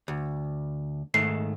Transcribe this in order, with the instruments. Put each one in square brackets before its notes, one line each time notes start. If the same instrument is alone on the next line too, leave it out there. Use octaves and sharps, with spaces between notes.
[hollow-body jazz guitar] D2
[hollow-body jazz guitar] G#2 D#3 A3 [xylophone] C7